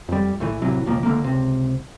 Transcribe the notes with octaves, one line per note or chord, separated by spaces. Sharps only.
F2 G3
A#1 A2 E3
A1 C3 E3 F#3
E1 C#2 F3 A#3
C#2 D3 A3 A#3
C#2 C3